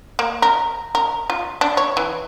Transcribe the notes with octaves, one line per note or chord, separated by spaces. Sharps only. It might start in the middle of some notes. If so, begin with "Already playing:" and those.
A#3
A#4
A#4
F4
D4
C#5
E3